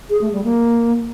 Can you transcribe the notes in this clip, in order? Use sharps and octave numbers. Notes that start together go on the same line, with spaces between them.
G#4
A3
G3
A#3